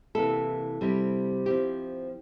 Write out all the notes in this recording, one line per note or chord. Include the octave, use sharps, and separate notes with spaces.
C3 E3 A#3 E4 A4
C3 G3 C4 E4
F3 C4 E4 G4